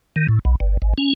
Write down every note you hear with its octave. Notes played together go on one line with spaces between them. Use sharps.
D#3
A2
B1
G1
G#1
C#4